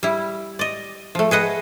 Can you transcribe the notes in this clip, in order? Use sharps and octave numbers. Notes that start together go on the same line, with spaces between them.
G3 E4
D5 D#5
F3 A3
G#4 B4 D#5 F#5